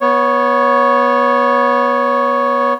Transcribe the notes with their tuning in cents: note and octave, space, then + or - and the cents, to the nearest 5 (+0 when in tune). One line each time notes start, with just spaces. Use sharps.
B3 -15 C#5 +0